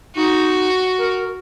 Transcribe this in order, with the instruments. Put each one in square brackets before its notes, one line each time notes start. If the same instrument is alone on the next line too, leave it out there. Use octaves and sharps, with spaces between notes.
[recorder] D#4 [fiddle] F#4
[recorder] A#4